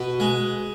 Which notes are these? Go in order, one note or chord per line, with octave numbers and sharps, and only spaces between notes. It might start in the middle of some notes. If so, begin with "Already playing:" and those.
Already playing: B2 B4
G#3